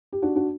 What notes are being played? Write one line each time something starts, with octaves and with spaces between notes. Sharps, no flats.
G4
D4 F#4
D4 F#4